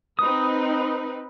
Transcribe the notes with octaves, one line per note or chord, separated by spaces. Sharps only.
C4 D#4 B4 D#6